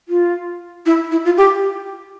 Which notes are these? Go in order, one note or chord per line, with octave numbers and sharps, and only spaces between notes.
F4
E4
E4
F4
G4